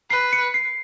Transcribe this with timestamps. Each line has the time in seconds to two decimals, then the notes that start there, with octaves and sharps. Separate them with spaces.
0.10 B4 C7
0.33 C#7
0.54 C7